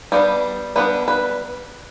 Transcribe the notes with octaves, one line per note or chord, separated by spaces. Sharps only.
G3 B3 D4
G3 B3 D4 B4
B4